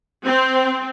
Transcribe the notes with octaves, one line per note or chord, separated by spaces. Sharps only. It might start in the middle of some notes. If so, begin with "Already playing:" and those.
C4